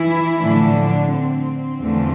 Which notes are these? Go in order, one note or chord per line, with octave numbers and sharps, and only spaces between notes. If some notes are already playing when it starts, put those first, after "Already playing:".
Already playing: E3 E4
A2 D3 F3 A3 D4
C4
E2 D3 F3 A3